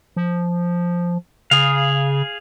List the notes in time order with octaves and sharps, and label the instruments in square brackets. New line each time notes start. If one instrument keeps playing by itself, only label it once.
[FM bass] F3
[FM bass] C#3 [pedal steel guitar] G#4 F5